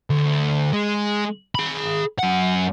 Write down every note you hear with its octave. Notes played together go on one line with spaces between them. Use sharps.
D2
G#3
G#4 B5
F#2 F#5